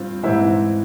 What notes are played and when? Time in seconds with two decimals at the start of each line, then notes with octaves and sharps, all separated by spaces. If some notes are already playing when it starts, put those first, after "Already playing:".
Already playing: G2 C4 F4
0.23 G#2 E3 C4 E4